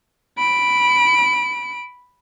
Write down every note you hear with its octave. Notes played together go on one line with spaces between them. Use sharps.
B5 D7